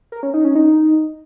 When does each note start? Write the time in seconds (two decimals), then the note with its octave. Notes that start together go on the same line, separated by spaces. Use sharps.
0.12 A#4
0.23 C#4
0.34 D#4
0.45 C#4
0.55 D#4